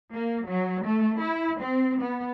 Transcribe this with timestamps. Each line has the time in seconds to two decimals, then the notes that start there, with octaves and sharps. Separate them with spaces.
0.12 A#3
0.45 F#3
0.84 A3
1.19 E4
1.60 C4
2.01 B3